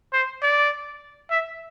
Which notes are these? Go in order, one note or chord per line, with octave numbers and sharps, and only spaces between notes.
C5
D5
E5